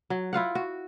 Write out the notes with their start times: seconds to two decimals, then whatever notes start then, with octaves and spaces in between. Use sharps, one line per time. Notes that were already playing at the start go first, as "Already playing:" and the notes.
0.10 F#3
0.33 E4 F4 F5 F#5
0.55 F#4